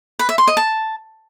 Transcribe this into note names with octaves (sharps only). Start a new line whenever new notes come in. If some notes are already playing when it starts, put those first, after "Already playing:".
B4
E5
C6
D#5
A5